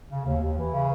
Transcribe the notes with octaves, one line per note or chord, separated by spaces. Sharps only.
C#3
D#2
D#2
E3
C#3